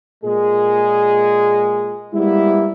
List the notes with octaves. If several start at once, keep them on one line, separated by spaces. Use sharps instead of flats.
A#2 G#3 G#4
G3 G#3 A#3 B3 E4